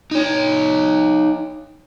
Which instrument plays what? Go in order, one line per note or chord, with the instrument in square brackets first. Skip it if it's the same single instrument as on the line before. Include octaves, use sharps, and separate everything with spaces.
[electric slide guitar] D#4 C#5